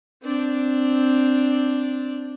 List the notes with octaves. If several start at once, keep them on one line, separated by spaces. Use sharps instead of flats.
C4 D4